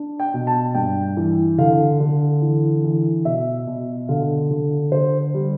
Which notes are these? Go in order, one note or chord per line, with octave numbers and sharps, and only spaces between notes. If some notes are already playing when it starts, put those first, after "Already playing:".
Already playing: D4
G5
B2
A5
G2 G5
E3
D3 F5
D3
E3
E3
B2 E5
B2
D3 F5
D3
D3 C5
G3